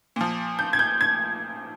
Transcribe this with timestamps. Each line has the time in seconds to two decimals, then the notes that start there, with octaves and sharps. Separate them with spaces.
0.16 A#2 F3
0.59 G6
0.73 G#6
0.79 G6
1.01 G#6